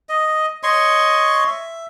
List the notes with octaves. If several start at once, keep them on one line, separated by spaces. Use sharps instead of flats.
D#5
C#5 D#5 C6 C#6
E5